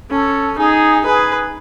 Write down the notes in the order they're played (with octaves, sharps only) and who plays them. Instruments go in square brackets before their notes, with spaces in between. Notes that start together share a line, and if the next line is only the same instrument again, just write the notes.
[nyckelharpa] C#4 [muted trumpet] A4
[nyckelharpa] D#4 [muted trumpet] G#4
[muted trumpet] G#4 [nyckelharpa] B4